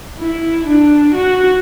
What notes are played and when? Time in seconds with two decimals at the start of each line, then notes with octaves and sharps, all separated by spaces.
0.19 E4
0.67 D4
1.14 F#4